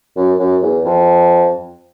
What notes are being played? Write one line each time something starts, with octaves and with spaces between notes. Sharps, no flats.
F#2
F#2
E2
F2